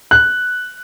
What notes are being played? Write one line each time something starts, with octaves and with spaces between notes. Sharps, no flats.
F#6